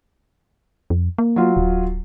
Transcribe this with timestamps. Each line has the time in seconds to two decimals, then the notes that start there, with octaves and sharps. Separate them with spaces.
0.90 F2
1.18 A#3
1.36 F#3 F4
1.57 D1